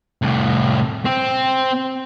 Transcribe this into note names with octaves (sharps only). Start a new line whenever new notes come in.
C2 A2
C4